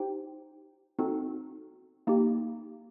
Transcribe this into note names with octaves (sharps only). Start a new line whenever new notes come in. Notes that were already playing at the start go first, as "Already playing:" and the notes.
Already playing: D#4 G4 C5 G5
C4 D#4 F#4 A4
A#3 D#4 G4